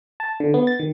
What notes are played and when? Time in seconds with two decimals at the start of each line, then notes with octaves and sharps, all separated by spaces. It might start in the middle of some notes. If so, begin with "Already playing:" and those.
0.20 A5
0.40 D3
0.54 B3
0.67 A6
0.79 D#3